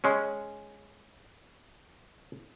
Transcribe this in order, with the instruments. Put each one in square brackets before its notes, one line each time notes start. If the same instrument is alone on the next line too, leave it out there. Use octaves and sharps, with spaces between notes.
[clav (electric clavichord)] G#3 C#4